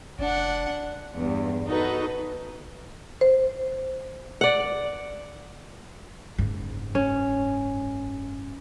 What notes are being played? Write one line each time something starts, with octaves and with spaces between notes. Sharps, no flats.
F1 D4 F#5
E2 G2
D#4 F#4 A4 B4
C5
D5 F#5
F#1 G#2
C#4